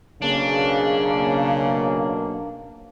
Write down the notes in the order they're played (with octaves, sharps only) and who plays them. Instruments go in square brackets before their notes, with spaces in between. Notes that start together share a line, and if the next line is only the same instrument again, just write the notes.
[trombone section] B1 A#3 [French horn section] C#3 [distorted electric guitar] D4